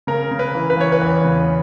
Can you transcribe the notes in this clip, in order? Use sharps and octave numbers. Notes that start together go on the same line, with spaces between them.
C#3 A#4
C#3
B4
E3
B4
E3 C#5
B4
E2
C#3